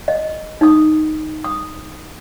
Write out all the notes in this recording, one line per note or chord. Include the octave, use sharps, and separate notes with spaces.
D#5
D#4 D#6
D#6